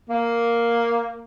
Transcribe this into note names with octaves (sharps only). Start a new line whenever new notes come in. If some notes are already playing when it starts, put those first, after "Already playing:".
A#3